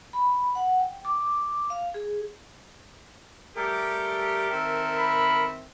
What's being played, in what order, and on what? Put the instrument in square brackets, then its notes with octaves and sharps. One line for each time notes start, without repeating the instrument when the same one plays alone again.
[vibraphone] B5
F#5
G5
D6
F5
G#4
[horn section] G3 A3 G4 [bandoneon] A4 A#4
[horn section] D#3 C4 E5
[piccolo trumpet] B5